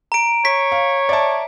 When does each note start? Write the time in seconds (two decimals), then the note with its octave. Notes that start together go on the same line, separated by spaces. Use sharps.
0.12 A#5 D7
0.45 C#5 B6
0.72 F5
1.09 D5 E5 A5